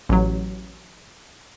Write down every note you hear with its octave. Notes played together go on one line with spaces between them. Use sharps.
A1 F#3